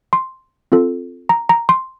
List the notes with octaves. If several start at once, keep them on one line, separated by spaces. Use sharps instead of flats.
C6
C4 F4 A4
A#5
A#5
C6